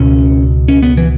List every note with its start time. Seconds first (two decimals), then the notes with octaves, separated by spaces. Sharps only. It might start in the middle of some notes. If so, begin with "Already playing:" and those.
Already playing: C#2 B2 C#4
0.68 C#4
0.83 B3
0.97 E3